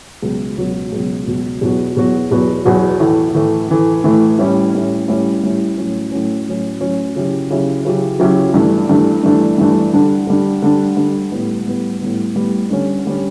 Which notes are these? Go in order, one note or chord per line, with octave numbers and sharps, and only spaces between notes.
C#2 B2 F#3
C#2 B2 F#3
C#2 B2 F#3
C#2 B2 F#3
E2 B2 F#3 B3 F#4
E2 B2 F#3 B3 F#4
E2 B2 F#3 B3 F#4
E2 B2 F#3 B3 F#4
A2 E3 A3
A2 E3 A3
A2 E3 A3
A2 E3 A3
A2 G3 C#4 E4
A2 G3 C#4 E4
A2 G3 C#4 E4
A2 G3 C#4 E4
A2 F#3 C#4
A2 F#3 C#4
A2 F#3 C#4
A2 F#3 C#4
C#3 F#3 C#4 E4 G4
C#3 F#3 C#4 E4 G4
C#3 F#3 C#4 E4 G4
C#3 F#3 C#4 E4 G4
G2 E3 A3 D4
G2 E3 A3 D4
G2 E3 A3 D4
G2 E3 A3 D4
D3 G3 D4
D3 G3 D4
D3 G3 D4
D3 G3 D4
A2 G3 B3
A2 G3 B3
A2 G3 B3
A2 G3 B3
D3 G3 C#4
D3 G3 C#4